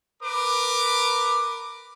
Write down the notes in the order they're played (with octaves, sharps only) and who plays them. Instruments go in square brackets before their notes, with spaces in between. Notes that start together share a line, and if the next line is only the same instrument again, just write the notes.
[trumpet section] A#4 B4 D6